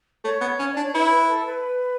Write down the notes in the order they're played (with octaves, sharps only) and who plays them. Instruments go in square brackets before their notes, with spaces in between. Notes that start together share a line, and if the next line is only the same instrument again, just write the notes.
[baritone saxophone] A3 [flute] C#5
[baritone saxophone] B3
C#4
[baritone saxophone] D4 [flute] D5
[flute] C#5
[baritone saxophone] E4 [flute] B4
[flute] B4
A4
B4